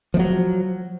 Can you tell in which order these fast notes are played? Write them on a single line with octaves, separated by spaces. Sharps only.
F3 A3 F#3